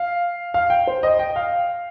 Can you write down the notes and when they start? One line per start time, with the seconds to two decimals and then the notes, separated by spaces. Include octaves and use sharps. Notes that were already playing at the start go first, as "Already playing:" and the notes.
Already playing: F5
0.54 F5
0.70 G5
0.87 C5
1.03 D#5
1.19 G5
1.36 F5